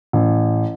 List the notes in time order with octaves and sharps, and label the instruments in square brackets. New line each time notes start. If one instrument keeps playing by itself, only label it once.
[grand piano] A1